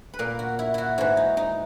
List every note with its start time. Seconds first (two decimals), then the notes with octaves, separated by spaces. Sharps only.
0.14 B4
0.19 A#2 A#4
0.39 F#4
0.59 E4
0.74 E4 F#4
0.98 G#2 E3 F#4
1.17 D#4
1.37 D#4